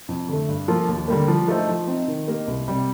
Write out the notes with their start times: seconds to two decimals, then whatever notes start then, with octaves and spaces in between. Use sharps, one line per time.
0.09 F2
0.29 D3 A3
0.48 G2
0.68 F3 A#3 F4 A4
0.88 D#2
1.08 D3 G3 A#3
1.28 F3
1.48 A3 D#4 A4 C5
1.67 F3
1.88 C4 D#4
2.08 D#3
2.28 A#3 D#4 G4 A#4
2.48 C2
2.68 C3 G3